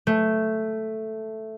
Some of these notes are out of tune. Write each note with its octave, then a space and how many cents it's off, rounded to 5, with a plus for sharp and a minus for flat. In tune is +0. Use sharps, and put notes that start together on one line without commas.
A3 +0